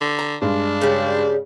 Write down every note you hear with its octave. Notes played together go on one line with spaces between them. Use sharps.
D3
A#5
G2 G#3 D4
C#3 G3